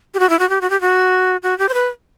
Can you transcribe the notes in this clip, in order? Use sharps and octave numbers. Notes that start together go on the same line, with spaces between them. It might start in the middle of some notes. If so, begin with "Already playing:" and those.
G4
F#4
E4
F#4
G4
F#4
G4
F#4
F#4
G4
C5
B4